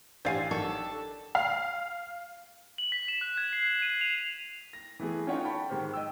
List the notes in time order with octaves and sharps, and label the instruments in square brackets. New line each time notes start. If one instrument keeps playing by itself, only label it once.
[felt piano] A1 A6 [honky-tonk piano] D4 G4 [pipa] C5 F5 G#5
[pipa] D#3 C#6 [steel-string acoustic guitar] A4
[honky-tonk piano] F5
[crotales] F#7
B6
E7
F#6
G#6
C7
G#6
D#7
F7
[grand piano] A#6
E3 A3 B3 G#4
C#4 D#4 F4 C#5 F#5 G5
F#5 G5 A5 B5 C#6
G#2 D#3 G4 C5 F6
D#5 G5 E6